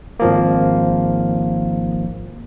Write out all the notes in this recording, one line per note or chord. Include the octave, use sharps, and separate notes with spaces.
G#1 F3 A#3